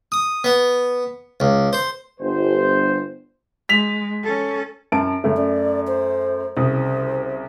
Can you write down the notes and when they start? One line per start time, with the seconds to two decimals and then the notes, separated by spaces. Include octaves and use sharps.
0.12 D#6
0.44 B3
1.40 C#2
1.73 C5
2.20 G1 C5
3.69 G#3 B6 F7
4.23 C#4 A4
4.92 F#2 A5 D7
5.24 F#2 C#3 A3
5.37 D5
5.87 C5
6.57 C2 C#3 C5 D#6